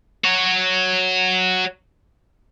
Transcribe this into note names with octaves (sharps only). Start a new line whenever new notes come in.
F#4 C#5